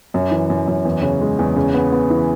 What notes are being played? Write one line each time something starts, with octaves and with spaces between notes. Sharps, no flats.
F#2
E3
F#2
F#2
E2
C#3
G#3
E2
C#3
B3
B3
E3